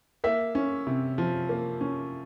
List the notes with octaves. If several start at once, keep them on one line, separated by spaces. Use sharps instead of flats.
A#3 E5
C#4
C3
F3
A#3
C#4